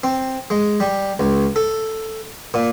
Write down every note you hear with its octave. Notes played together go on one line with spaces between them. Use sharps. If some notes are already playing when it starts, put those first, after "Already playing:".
C4
G#3
G3
C#2
A4
A#2